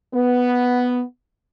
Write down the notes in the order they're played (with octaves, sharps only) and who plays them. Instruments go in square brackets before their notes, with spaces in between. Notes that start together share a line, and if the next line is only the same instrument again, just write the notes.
[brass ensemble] B3